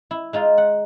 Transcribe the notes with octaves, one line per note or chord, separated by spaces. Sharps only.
E4
G#3 D#4 F4
F#5